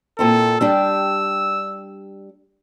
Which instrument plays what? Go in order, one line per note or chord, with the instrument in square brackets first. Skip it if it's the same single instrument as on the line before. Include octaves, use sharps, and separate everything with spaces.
[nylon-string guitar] A#2 C4 E4 [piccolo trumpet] A4
[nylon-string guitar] G3 D4 G4 [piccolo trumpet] E6